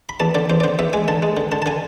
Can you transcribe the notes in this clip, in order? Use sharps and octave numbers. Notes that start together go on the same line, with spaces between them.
B5
E2 A5
D3 D5
E2 C5
D5
D3 C5
E2 E5
G#3 G#5
D3 A5
G#3
D3
D3 A5
A5
D3 G#5